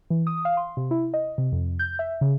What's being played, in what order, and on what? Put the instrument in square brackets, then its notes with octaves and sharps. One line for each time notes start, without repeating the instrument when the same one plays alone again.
[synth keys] E3
D#6
F5
C6
C3
E4
D#5
C3
F2
G6
E5
C#3